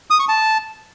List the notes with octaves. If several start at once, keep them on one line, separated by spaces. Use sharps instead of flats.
D#6
C#6
A5